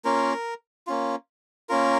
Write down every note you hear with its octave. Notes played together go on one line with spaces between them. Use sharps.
A#3 C#4 F4 A#4
A#3 C#4 F4
A#3 C#4 F4 A#4